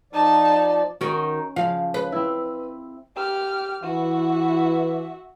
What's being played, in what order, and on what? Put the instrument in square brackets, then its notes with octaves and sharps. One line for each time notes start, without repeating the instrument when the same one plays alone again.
[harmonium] F3 D5 [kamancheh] D#4 A5
[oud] D#3 F#4 [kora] C#4
[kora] C#3 F3 [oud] F5
[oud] B4
[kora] C4 E4
[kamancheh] G4 F6
[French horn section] E3 [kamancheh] F#4 E5